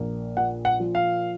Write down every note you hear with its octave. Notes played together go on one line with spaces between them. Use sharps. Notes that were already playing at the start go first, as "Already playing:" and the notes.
Already playing: A#1 A#3
A#2 F#5
F#5
F3
F5